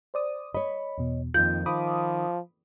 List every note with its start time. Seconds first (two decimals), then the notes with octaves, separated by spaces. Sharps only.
0.14 C5 D5 D#6
0.54 C#5 D#5 B5
0.98 E2 B2
1.34 F2 D#3 A#3 F4 G6
1.66 D#3 F3 B5 D6 D#6